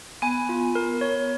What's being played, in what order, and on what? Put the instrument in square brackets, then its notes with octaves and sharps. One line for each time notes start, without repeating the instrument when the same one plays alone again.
[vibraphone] B3 [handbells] G#5
[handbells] F4
A#4
C#5